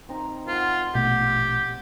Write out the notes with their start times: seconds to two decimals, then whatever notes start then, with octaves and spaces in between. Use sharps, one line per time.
0.09 C4 D#4 A#5
0.48 F4 C5 F#5
0.95 A#1 B2 A3 G4 F#5